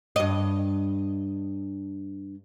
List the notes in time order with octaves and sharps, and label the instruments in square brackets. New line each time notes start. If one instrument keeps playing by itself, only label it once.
[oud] G2 D#5